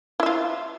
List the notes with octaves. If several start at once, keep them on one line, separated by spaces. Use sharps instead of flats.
E4 F4 E5